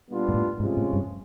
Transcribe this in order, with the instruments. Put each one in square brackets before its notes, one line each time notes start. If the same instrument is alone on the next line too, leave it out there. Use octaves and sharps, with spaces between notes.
[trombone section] A#2 G3 B3 D4 F4
[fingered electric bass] G#2
A2
[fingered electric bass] G#2 [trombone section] C3 F3 G#3 C#4 F4
[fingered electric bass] A2
G2